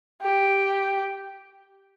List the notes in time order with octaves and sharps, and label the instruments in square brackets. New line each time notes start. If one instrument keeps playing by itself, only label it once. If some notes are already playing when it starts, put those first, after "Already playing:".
[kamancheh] G4